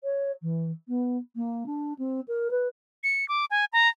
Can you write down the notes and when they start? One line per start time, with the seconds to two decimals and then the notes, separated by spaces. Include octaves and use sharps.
0.04 C#5
0.42 E3
0.88 B3
1.36 A#3
1.66 D4
1.98 C4
2.28 A#4
2.50 B4
3.04 C#7
3.29 D6
3.51 G#5
3.73 A#5